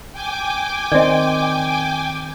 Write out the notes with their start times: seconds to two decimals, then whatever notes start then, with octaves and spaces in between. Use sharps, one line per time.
0.13 G5 G#5 D6
0.92 D#3 C4 D5 D#5